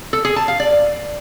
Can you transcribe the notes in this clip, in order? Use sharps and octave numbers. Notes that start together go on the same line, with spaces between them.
A4
G#4
A5
F5
D5